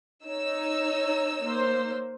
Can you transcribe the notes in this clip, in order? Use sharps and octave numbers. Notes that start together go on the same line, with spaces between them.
D#4 C#5 E6
A#3 C5